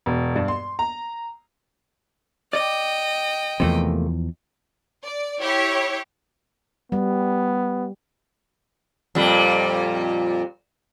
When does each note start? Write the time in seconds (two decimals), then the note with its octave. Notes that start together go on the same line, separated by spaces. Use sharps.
0.06 E1
0.36 G2
0.48 C6
0.79 A#5
2.53 D5 D#5 G5
3.60 E2 C3 F3 A3 A#3
5.04 D5
5.42 E4 G4 C#5
6.92 G3 B3
9.15 F2 A#2 G3